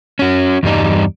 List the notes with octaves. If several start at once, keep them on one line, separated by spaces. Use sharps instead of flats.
C#4 F#4
E2 G2 G3 D#4